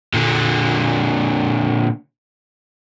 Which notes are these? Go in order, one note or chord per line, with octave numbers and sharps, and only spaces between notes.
A#2 D3